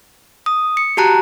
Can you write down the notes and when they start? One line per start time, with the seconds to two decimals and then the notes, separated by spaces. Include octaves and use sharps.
0.46 D#6
0.77 C#7
0.97 F#4 G4 A5 A#5 F#6